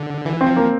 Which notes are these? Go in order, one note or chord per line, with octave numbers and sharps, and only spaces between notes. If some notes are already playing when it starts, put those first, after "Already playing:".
Already playing: D3
E3
C4
F3
A#3